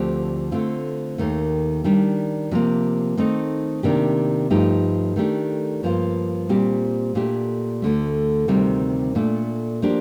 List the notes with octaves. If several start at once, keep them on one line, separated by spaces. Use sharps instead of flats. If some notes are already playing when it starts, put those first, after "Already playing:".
Already playing: D2 D3 F3 C4 G4
D3 A3 C4 F4
D#2 D#3 A3
D#3 G3 D4 G4
C3 F3 A#3
D#3 A3 C4 D#4
C3 D#3 A#3 D4 G4
G2 F3 A3 D#4 G4
D#3 A3 D4 G4
G2 F3 A#3 F4
A#2 G3 C4 G4
A#2 A3 D4 G4
D2 D3 A3
D2 C3 D#3 G3 C4
A#2 A3 D4
F3 A#3 D4 G4